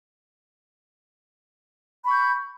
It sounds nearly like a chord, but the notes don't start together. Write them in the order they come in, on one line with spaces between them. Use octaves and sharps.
B5 C#6 G6